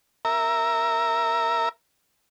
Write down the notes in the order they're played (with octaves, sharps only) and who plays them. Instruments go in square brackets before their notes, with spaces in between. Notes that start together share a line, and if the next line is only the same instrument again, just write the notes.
[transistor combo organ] A#4 E5 A#5